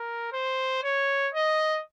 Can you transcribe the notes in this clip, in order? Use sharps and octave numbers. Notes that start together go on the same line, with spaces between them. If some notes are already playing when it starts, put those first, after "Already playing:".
Already playing: A#4
C5
C#5
D#5